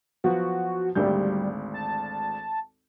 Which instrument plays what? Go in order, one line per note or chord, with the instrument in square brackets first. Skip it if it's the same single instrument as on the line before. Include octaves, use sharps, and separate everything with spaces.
[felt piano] F3 F#3 B3 [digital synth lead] F#4
[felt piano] G#1 D2 G6 [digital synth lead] G3
[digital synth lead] A5